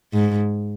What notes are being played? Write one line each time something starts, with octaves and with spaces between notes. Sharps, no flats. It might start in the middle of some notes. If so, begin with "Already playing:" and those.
G#2